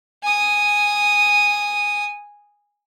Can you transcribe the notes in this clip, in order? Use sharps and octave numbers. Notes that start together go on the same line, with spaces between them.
G#5 D#6